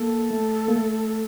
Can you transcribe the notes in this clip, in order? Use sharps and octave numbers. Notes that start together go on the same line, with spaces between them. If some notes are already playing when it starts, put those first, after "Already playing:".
Already playing: A#3 A4
A3
A#3
A3